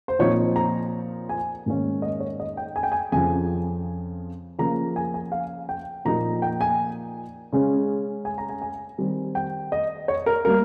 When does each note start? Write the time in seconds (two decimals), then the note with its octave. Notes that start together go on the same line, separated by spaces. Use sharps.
0.08 C5
0.19 A#2 F3 C4 D#4 C#5
0.56 A#5
1.29 G#5
1.66 G#2 D#3 A#3 C#4
2.02 D#5
2.20 C#5
2.40 D#5
2.57 G5
2.76 G#5
2.83 G5
2.92 G#5
3.12 F2 C#3 F3 G#5
4.59 C#3 F3 A#3 A#5
4.96 G#5
5.14 G#5
5.32 F5
5.69 G5
6.05 A#2 F3 A#3 D#4 A#5
6.42 G5
6.61 G#5
7.53 C#3 G#3 C#4
8.25 G#5
8.38 A#5
8.49 G#5
8.62 G#5
8.98 D#3 G3 C4
9.35 G5
9.72 D#5
10.08 C#5
10.26 A#4
10.45 G3 A#3 A#4